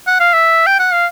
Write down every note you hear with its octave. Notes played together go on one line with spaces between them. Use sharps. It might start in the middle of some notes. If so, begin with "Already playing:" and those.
F#5
F5
E5
G5
F#5
F5